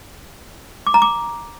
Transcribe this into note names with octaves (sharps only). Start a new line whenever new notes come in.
D6
A#5
D6